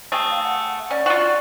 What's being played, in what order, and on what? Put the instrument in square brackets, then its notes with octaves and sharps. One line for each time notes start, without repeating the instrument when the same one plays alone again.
[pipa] A3 G#4 [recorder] G5
[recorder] F5
F#5
[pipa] C#4 [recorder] D5
[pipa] F4 F#4